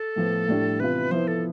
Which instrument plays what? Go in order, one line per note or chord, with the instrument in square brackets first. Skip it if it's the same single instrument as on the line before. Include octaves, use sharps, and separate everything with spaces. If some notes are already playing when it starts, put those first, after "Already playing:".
Already playing: [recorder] A4
[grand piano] A2 F3 B3
A2 G3 D4
[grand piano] C3 E3 B3 F4 [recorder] B4
[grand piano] F3 B3 E4 [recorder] C5
[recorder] A4